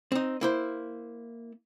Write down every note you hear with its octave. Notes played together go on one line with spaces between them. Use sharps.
C4 D#4
A#3 E4 C5